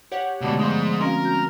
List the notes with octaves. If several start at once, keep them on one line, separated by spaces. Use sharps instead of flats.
G4 C#5 F#5
B2 D3 G#3 A3 D4
F3 G#3 B3 C5
C4 C#4 F#4 A#4 F5
F#4 G6